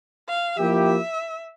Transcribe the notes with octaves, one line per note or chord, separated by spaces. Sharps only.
F5
F3 A#3 E4 G4 E5
E5